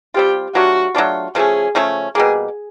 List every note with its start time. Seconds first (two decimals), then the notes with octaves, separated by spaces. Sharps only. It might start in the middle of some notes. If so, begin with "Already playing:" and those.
0.14 G3 C4 F4 G4
0.54 F#3 A3 D4 F4 F#4
0.95 F#3 A3 D4 F4
1.35 C#3 F3 A3 C#4 G#4
1.75 C#3 F3 A3 C#4
2.15 B2 G3 A#3 G#4